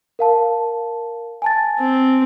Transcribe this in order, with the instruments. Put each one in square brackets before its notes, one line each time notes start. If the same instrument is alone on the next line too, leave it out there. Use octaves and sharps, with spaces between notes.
[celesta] A#4 F5 A5
G#5 A5 A6
[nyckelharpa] C4